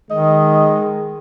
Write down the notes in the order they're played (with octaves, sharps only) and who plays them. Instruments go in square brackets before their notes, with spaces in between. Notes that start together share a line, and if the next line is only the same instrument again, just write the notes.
[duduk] D#3 [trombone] G#3 [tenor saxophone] D#5